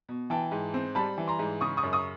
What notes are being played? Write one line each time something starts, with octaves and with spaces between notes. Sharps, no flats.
B2
E3 G5 A5
G#2
C4
G3 A5 B5
E3
A#5 C6
G#2
C#3 C#6 D#6
C#6 D#6
F#2
C#6 D#6